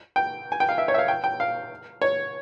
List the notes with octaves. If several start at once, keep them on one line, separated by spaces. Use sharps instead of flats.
G5
G#5
G5
F5
E5
C#5
E5
F5
G5
G5
F5
C#5